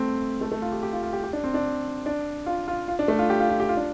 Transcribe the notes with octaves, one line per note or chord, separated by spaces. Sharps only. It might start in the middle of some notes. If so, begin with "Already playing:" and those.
Already playing: A3 C4
A3
A3
F4
G4
G4
F4
F4
G4
G4
D4
C4
D4
D4
F4
F4
F4
D4
A3
F4
G4
F4
F4
G4
F4
D4